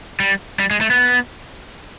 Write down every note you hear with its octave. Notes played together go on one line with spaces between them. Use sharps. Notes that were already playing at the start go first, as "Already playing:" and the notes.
G3
G3
G#3
A3
B3